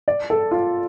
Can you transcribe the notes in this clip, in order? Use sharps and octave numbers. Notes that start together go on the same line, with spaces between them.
D5
A4
F4